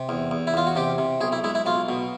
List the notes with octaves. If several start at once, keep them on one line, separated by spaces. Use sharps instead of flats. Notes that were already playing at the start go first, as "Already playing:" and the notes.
Already playing: C3
E2
E2
E4
E2 F4
F#4
C3 G4
C3
B1 G#4
E4
G#3 E4
E4
B1 F4
B2